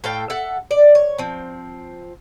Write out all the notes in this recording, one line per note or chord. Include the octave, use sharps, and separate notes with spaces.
A2 A4 F5 G5
A4 E5 F#5
D5
C#5
F3 C4